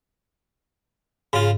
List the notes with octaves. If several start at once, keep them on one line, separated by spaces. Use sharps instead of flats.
G#2 C#3 F4